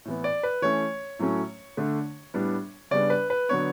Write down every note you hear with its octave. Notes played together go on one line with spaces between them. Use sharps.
A2 E3 B3
D5
B4
E3 A3 C#4 C#5
A2 F#3 A3 C#4
D3 A3 D4
A2 G3 B3 D4
C#3 G3 B3 D4 D5
B4
B4
D3 F#3 B3 D4 C#5